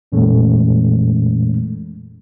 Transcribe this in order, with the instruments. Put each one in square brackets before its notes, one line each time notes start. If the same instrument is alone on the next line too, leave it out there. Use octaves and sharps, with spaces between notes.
[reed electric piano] F2 A#2 E3 G#3 A3 C#4